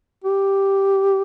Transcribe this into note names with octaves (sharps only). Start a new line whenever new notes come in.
G4